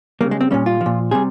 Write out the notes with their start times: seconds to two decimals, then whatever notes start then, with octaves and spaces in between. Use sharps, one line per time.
0.21 C#3 G3 A#3
0.31 G#3
0.41 C4
0.51 A#2 G3 C#4
0.66 F4
0.81 F3
0.86 A#2
1.11 C3 G3 G#4